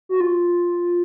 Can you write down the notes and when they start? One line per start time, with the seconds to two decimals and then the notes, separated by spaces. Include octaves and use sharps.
0.09 F#4
0.20 F4